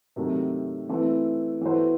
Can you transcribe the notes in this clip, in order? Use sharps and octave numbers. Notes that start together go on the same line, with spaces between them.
C3 D#3 F#3 A3
E3 A3 C4
E3 B3 F#4 A4 C5